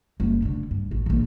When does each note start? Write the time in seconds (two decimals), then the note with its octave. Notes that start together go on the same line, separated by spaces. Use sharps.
0.20 F#1 G3
0.42 D2 D3
0.71 G2
0.91 A1
1.06 A#1 E3